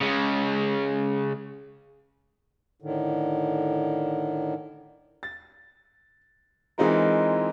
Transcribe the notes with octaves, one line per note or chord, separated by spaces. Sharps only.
C#3 G#3
A2 D3 D#3
A6
E3 G#3 C4 D#4 F4 A#4